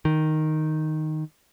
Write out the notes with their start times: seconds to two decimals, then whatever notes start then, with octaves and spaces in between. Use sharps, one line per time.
0.05 D#3